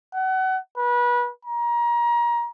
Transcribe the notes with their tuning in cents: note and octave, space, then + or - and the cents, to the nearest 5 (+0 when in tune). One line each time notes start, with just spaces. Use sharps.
F#5 +30
B4 -30
A#5 +30